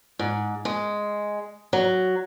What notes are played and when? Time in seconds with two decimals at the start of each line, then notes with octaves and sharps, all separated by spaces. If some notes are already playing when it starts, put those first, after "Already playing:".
0.19 G#2
0.65 G#3
1.73 F#3